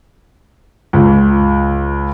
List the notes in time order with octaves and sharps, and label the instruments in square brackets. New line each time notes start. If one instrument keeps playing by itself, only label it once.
[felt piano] C#2